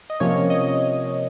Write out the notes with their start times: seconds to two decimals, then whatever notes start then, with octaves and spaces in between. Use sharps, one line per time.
0.10 D#5
0.20 C3 F3 A#3 C#4 C#5
0.50 D#5